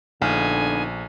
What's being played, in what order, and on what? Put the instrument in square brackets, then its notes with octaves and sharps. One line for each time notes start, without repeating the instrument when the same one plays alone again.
[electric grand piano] A#1 [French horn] D3 [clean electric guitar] B3 D#4 F5 [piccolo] G#5